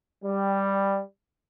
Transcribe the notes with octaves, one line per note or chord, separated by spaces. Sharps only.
G3